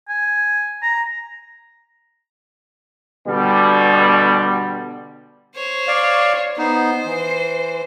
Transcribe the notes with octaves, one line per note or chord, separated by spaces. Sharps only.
G#5
A#5
B2 D3 G3
C5 C#5
D5 F5
B3 D#4 C5
E3